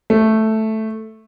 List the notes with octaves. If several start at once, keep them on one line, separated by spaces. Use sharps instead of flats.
A3